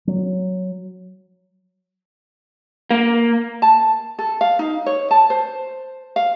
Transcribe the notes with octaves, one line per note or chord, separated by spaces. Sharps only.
F#3
A#3
A5
A4
F5
D#4
C#5
A5
C5
F5